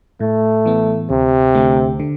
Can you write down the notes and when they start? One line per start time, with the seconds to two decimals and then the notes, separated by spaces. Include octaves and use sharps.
0.20 A2 A3
0.65 E3 B3
1.10 D2 C3
1.55 D3 A3
2.00 D3